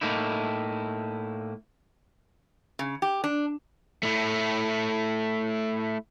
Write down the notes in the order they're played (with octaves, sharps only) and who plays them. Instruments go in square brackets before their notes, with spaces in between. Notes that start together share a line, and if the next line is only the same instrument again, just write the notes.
[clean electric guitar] A2 A#3 D#4 E4
[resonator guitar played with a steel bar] C#3
G4
D4
[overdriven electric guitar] A3 E4